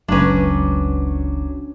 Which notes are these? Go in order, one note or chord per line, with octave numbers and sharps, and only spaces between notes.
F#1 C#2 F#3 C#4 D4 B4